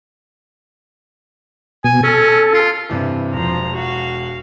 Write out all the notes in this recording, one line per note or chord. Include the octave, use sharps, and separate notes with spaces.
B2 G#5
C#4 A4
F4
G2 C3 E3
E1 F3 A#5
F#4 F5